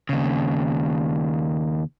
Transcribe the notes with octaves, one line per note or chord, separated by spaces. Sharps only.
D#2 C#3